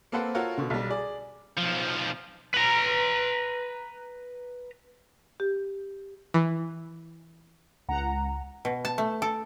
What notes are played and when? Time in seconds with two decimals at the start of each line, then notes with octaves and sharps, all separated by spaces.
0.12 A#3 C4 A4 B4 C5 F#5
0.35 F4 F#4 A4 A#4 C#5
0.58 B2 D3
0.70 B1 G3
0.90 G#4 D5
1.57 B1 F3
2.54 B4 A#5
5.40 G4
6.34 E3
7.88 C#2 F#5 A#5
8.65 B2
8.85 A5
8.98 A3
9.22 A4